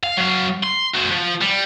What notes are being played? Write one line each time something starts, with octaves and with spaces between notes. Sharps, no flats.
F5
F#3 F5
C6
F#4 C5
F3
G3